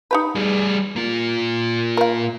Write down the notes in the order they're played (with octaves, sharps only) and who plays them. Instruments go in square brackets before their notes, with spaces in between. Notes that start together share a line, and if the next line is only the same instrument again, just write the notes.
[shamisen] D#4 G4 B4
[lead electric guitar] G3 G#4
A#3 F4
[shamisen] A#4 F5